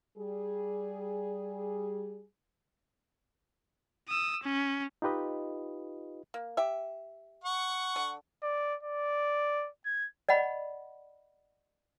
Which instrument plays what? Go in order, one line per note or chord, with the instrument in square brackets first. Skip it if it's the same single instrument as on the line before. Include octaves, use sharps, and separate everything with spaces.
[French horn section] G3 G#4
[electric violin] D#6 E6
C#4
[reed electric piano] D#4 F4 G4 B4 D#5
[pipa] A#3
G4 E5
[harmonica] F#5 C#6
[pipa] D3
[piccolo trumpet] D5
D5
G#6
[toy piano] D5 D#5 F#5 B5